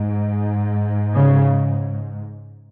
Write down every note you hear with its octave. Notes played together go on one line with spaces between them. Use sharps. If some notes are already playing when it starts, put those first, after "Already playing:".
Already playing: G#2
C#3